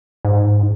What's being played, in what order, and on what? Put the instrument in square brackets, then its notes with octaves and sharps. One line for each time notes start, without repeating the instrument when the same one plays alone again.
[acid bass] G#2